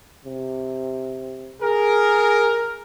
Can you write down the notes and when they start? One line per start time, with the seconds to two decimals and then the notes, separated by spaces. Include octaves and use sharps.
0.25 C3
1.61 G#4 A#4